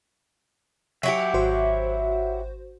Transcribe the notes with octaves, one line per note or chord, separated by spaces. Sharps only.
F#3 E4 G4 E5 F#5
G#1 F#4 C5